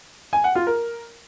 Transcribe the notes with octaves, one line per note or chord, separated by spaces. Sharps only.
G#5
F#5
F4
A#4